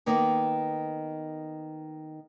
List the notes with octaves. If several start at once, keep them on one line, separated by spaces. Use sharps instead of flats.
D#3 A#3 B3